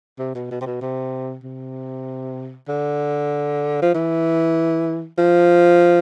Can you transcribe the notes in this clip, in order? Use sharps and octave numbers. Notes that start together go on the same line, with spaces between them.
C3
B2
B2
C3
B2
C3
C3
D3
F3
E3
F3